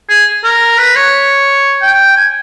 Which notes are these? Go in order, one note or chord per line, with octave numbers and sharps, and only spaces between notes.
G#4
A#4
B4
C#5
G5
G#5